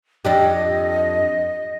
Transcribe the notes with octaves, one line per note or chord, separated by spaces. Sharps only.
F2 D4 G4 D#5